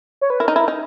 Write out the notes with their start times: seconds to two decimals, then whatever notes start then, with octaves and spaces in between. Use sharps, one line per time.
0.21 C#5
0.30 B4
0.40 E4 A#4
0.48 D#4
0.56 E4
0.68 D#4